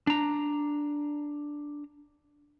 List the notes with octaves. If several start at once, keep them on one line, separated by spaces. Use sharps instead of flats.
D4 A#5